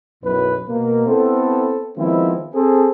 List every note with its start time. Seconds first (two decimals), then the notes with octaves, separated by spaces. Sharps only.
0.24 B1 F#2 B2 F#3 E4 B4
0.69 B2 A#3
1.07 B3 C4 E4 A4
1.98 D#3 F3 G#3 B3 C4 E4
2.54 C4 G#4 A4